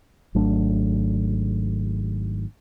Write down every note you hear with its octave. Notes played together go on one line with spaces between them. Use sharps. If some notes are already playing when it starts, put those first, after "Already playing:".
G#1 F#3 A3 D4